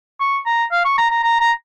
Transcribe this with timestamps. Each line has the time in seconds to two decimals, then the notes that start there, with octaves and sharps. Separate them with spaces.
0.20 C#6
0.46 A#5
0.72 F5
0.84 C#6
0.98 A#5
1.11 A#5
1.23 A#5
1.40 A#5